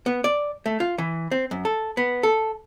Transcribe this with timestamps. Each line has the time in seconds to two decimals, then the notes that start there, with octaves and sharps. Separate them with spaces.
0.06 B3
0.24 D5
0.66 A3
0.80 F4
0.98 E3
1.31 C4
1.51 F#2
1.65 A4
1.97 B3
2.23 A4